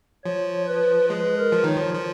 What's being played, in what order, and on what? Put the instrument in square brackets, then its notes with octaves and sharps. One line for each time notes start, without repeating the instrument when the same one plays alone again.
[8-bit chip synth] F3 [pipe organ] C#5
[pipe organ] B4
[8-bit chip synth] G#3 [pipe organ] B4
[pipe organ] A#4
[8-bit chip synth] F3
[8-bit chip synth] D#3 [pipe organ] C#5
[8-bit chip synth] F3
F3